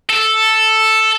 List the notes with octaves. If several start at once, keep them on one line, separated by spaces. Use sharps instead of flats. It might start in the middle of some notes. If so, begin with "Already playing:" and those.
A4